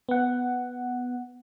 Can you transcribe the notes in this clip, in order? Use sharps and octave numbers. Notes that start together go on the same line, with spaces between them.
B3 F#5